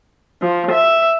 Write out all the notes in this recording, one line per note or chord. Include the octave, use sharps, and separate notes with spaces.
F3
E5